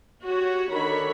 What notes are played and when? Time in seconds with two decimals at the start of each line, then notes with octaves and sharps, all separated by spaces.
0.23 F#4 G4 C#5
0.71 D3 D#3 C#5 B5